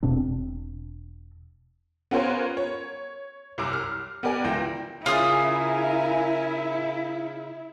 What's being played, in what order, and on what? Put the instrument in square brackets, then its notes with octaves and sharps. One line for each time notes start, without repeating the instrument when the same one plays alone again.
[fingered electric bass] E1 B2 C4 D4
[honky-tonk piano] B3 C#4 F4 A#4 C5 C#5
C#5
C2 F#2 D6 E6
F6
B3 G4 A#4 D5 G#5
C#2 E3 G5 A#6 E7
[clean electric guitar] C#3 [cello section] E4 [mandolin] F4 G#4 D#6 [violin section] A#4 G#5